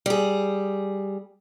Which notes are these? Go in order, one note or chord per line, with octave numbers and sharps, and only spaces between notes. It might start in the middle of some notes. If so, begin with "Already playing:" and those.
G3 G#4